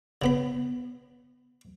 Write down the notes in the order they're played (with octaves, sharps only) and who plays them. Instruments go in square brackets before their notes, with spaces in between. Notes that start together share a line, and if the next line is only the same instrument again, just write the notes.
[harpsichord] C#3 B3 B5